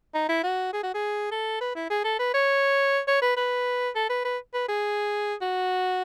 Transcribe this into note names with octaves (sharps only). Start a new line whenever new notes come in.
D#4
E4
F#4
G#4
F#4
G#4
A4
B4
E4
G#4
A4
B4
C#5
C#5
B4
B4
A4
B4
B4
B4
G#4
F#4